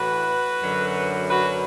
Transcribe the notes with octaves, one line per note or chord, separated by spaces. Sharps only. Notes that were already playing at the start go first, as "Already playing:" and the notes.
Already playing: A2 E3 F#4 B4
F#2 D3 F#3
F#4 B4